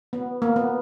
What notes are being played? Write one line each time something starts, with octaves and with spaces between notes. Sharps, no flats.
B3
A#3
B3